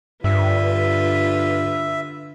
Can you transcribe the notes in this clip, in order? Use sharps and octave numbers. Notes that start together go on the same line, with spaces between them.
G2 D3 F4 B4 E5